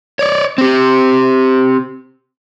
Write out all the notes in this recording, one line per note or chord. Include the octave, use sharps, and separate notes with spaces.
C#5 D5
C4 G4